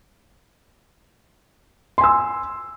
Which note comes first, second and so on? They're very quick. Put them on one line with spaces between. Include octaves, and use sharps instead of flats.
C6 G#5 E6